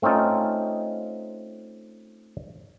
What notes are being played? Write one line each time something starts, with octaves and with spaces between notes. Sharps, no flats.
A3 C4 C#4 D#4 F4